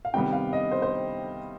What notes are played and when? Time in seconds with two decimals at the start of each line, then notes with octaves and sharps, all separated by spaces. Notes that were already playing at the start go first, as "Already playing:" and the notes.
0.05 F5
0.14 C3 D#3 G3 B3 G5
0.33 F5
0.53 D#5
0.71 C5
0.82 C5